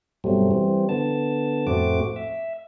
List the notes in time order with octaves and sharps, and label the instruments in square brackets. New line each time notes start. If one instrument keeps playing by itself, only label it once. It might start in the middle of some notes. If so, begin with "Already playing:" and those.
[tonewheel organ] G2 B2 F#3 G3 A3 C4
E3 G3 C4
D3 B3 A5
F2 A2 A3 C4 F#4 D6
E5